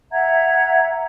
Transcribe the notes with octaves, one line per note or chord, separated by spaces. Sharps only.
E5 F#5 A#5 G#6